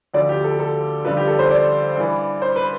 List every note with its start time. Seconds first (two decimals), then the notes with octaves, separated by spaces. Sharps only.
0.14 D2 D3 F3 D5
0.29 G4
0.44 A4
0.60 A4
1.05 G2 D3 F3 B4
1.17 G4
1.28 A4
1.39 C5
1.50 D5
1.96 G2 E3
2.42 C5
2.56 B4